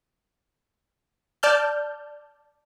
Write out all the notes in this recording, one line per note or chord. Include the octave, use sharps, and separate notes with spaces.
D5 A5 F6 G6